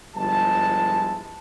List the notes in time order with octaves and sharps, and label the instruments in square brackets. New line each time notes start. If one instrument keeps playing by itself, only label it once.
[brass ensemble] G1 F3 G3 G#3 E4 A5